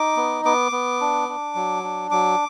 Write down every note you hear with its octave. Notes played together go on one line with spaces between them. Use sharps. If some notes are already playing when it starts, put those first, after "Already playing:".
Already playing: D#4 D6
B3
B3 D6
B3
D4
D4
F#3
D4
F#3 D6